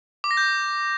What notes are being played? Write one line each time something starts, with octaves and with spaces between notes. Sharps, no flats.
D6
A#6
G6